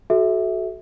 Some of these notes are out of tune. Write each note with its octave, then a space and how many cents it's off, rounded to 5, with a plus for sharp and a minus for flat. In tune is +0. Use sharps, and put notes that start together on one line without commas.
F#4 +0 A4 -35 E5 -10